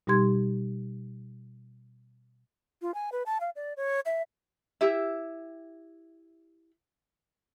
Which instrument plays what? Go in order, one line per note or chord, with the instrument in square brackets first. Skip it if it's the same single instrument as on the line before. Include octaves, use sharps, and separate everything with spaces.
[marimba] B2 G3 D#4 G4 C6 G#6
[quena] F4
G#5
B4
A5
F5
D5
C#5
E5
[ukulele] E4 G4 E5